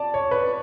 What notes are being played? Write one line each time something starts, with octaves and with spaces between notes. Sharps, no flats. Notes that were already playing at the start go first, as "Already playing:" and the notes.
Already playing: D5 A5
C#5
B4